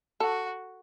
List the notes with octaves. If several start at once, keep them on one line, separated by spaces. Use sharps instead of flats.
F#4 A4